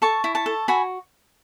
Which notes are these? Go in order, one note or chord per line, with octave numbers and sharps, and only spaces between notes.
A4 A5 C#6
E4
A5 C#6
A4
F#4 G#5 B5